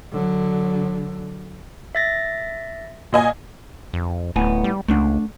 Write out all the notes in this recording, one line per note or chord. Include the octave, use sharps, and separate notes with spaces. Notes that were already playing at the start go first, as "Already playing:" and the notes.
D3 F#3
E5 A6 A#6
A#2 D#5 G#5
F2
D1 A2 B3 G#5
G3
C#2 A3 D4